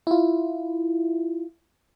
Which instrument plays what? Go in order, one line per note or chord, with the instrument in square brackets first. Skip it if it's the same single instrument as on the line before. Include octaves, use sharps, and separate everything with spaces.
[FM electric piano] E4 F4